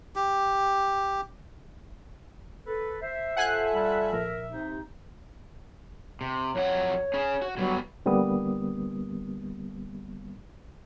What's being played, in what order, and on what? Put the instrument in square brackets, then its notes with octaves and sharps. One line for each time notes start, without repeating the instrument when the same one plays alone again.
[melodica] G4
[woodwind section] A4 B4
[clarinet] C5 [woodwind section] E5
[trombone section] F4 A4 [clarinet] C5 [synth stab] F#5 G#5 F#6
[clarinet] G3
[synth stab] A#1 [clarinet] A#4
[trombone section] C3 [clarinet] D#4
[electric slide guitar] C3
[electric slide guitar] F2 F#3 F#5 [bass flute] C#5
[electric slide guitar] C#4 G#4
F#4
[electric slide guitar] D3 G3 B3 [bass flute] F#3
[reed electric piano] D#2 D3 G3 A#3 B3 D#6